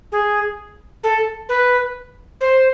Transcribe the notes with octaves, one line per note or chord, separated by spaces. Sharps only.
G#4
A4
B4
C5